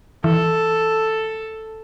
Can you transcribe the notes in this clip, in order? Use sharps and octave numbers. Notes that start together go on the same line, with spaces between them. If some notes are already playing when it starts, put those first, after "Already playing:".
E3 A4